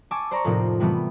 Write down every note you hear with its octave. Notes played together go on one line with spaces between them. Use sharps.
G#5 A5 C#6 D6 E6
C5 D5 A#5 C6 C#6
F2 A2 C3 F3 A#3 D#4
C3 E3 G3 A3 B3